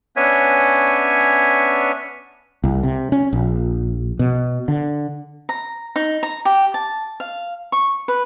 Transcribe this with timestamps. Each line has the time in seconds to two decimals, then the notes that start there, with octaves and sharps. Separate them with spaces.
0.16 B3 C#4 D4 C#5 E5 G#5
2.64 C2
2.83 C3
3.12 C#4
3.33 A#1
4.19 B2
4.68 D3
5.49 A#5
5.96 D#4
6.23 A#5
6.45 G4
6.74 A5
7.20 F5
7.72 C#6
8.08 B4